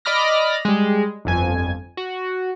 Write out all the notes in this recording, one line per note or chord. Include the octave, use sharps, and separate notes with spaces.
D5 D#5 B5 D6 F6 A#6
G3 G#3
G1 F2 G#5
F#4